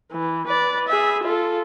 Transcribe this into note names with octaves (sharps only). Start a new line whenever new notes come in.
E3
B4 D5
G#4 E5
F4 A4